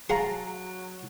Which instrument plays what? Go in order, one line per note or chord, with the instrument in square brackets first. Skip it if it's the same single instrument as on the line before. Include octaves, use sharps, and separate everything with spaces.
[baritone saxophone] F#3 [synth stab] G#4 A5 A#5 [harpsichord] F5 F#5 C6